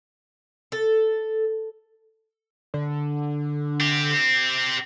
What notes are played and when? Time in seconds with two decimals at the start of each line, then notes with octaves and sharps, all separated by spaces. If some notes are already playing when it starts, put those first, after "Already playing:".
0.72 A4
2.74 D3
3.80 C4 G4